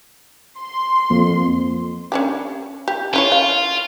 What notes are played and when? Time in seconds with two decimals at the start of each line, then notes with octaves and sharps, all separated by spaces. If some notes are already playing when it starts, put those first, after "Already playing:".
0.61 C6
1.10 F2 A#3
2.12 C#4 D4 G4
2.88 G4
3.13 C#4 E4 F4 C#5
3.32 F5